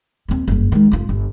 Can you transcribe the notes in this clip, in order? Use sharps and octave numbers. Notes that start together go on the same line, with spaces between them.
D#2 C4
F#1 G2
D#3 G#3
F1 F4
G1